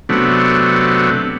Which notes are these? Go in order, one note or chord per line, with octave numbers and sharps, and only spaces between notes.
C3 F#3 A3 B3 D4